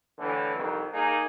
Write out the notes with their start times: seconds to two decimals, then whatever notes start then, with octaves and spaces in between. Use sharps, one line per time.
0.18 A2 D3 E3
0.56 C2 F2 D#3
0.94 A#3 D#4 G#4